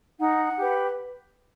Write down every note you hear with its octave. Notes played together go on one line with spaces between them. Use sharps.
D#4 F#5
G4 B4